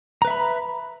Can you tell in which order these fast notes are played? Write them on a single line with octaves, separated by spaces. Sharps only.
A#5 B4 E5 B5